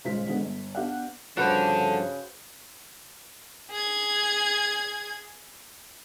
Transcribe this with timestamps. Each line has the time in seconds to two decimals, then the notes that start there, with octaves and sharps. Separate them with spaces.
0.05 D#1 C#3 G#3 F4 C5 B6
0.28 D3 G#3 B3
0.40 G1
0.75 B3 D4 G4 D5 F5 F#5
1.37 G2 C#3 F3 D4 F#4 A4 B4 C5
3.71 G#4 G#6